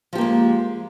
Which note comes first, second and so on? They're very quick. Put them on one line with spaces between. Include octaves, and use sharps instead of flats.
F3 G4 A#3 G#3